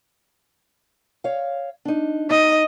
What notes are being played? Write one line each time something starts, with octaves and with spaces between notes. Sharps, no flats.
C#5 F5
D4 D#4
D#4 D#5